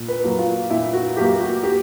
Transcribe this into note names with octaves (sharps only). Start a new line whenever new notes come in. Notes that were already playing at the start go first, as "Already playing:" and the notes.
Already playing: A#2
B4
F#3 A#3
F4
A#2 E4
F#4
F#3 A#3 G4
F#4
G4